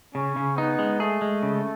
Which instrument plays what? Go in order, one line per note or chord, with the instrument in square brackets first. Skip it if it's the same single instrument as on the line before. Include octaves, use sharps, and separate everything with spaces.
[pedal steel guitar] C#3 [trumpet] C#4
[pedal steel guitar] C#3
[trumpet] B3 [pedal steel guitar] D#4
[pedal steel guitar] G#3
[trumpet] A3 [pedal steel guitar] G#4
[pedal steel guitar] G#3
C#3